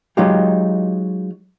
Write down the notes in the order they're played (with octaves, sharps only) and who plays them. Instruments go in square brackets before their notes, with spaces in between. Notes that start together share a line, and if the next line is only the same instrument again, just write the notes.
[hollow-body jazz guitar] F#3 G#3 D#4 F4 G4